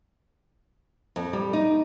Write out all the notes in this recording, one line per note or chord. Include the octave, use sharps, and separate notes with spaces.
F2
G3
D#4